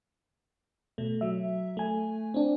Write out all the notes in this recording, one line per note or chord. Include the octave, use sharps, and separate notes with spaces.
B2 A3
F#3 E5
A3 G#5
C4 D4